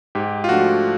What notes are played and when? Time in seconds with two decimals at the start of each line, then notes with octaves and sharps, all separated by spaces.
0.15 G#2 G4
0.44 F4
0.49 F3 A3 D4 F#4